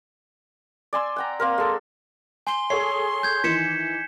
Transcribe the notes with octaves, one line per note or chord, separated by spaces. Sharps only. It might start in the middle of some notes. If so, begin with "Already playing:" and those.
D5 G#5 C6 E6
F#5 G5 A#5
A#3 C4 A#4
G#3 A4
G#5 C6 G7
G#4 A4 C#5 C7
G6 G#6
D#3 E3 B6 C#7 E7